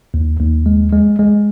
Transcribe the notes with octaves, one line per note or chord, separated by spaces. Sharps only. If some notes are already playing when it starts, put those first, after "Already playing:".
D#2
D#2
G#3
G#3
G#3